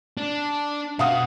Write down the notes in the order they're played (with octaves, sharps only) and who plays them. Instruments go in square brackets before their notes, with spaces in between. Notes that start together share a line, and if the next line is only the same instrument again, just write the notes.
[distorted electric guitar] D4
[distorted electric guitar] B2 [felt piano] F5 F#5 D#6